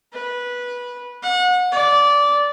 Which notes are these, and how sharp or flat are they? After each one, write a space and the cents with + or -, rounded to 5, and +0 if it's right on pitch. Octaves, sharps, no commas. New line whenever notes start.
B4 -15
F#5 -30
D5 -15